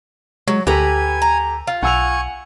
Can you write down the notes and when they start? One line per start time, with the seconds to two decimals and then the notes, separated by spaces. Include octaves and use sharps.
0.48 F#3 G#3
0.67 D2 G4 A4 B4 G#5 A#5
1.22 A#5
1.67 F4
1.83 B1 F#5 G#5 C#6 E6 F7